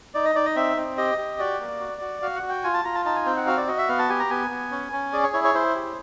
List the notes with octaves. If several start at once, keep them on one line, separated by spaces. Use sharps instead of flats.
D#4 D5
D#5
D#4 D5
D#5
C4 E5
C4
G4 D#5
G4
F#4 D5
A#3
F#4
F#4
F#4 F5
F#5
F#4
G5
F4 G#5
A5
F4 A#5
A5
D#4 A5
G#5
C4 G5
F#5
F#4 F5
D5
F#4 D#5
E5
B3 F5
A5
G4 G#5
A#5
B3 G#5
B3
C#4
C#4
G#4 D5
C#5
E4 C#5
C#5
E4 C5
G4